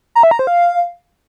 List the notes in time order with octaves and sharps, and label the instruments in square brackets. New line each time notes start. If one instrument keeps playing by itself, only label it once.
[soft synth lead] A#5
E5
A#5
C5
F5